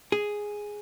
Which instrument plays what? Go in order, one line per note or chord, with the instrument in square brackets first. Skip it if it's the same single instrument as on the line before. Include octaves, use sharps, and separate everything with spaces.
[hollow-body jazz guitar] G#4